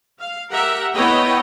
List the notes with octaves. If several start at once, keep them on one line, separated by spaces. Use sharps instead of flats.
F5
G4 A#4 E5 F#5
B3 E4 C#5 D#5 G5